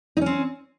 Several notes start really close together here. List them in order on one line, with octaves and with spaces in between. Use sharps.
D#4 C#4 C4